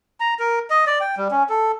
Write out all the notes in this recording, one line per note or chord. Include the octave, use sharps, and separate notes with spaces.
A#5
A#4
D#5
D5
G5
G3
C#4
A4